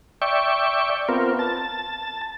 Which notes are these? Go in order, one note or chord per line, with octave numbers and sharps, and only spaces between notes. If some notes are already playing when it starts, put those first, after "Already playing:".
D5 E5 G5 C#6
B3 C4 F4 A#4
A5